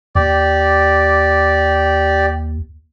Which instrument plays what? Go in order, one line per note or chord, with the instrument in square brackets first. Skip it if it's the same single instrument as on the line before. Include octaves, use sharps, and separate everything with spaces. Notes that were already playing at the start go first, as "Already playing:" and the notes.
[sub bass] D#2 [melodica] G4 D5